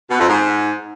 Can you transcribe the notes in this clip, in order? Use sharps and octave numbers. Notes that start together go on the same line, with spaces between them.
B2
F2
G#2